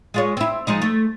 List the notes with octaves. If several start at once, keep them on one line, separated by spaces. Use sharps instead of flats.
G#3 F4 C#5
C4 E4
F3 G#3 D#4
A3